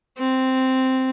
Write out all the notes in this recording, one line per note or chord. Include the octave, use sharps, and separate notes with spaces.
C4